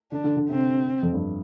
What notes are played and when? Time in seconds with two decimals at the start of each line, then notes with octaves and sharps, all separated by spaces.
0.12 D3 D4
0.24 D3
0.37 D3
0.49 C3 C4
1.03 F2
1.14 G2